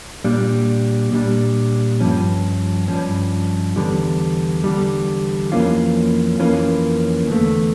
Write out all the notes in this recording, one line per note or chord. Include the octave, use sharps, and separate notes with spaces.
A#2 G3 D4
A#2 G3 D4
G2 F3 C#4
G2 F3 C#4
E2 D3 G3
E2 D3 G3
F2 E3 A#3 C#4 F4
F2 E3 A#3 C#4 F4
E2 D3 A3